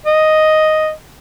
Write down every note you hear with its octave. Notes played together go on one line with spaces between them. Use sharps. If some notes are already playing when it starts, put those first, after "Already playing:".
D#5